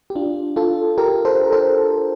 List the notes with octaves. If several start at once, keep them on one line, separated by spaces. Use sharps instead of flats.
G4
D4 F4
F4 A4
G4 A#4
A4 C5
A#4
A4 C5